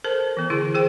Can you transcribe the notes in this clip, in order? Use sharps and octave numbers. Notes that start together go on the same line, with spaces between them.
A4 A#4 C5 A5
E3 B3
D3 E4 G#4
G#4 C5 G5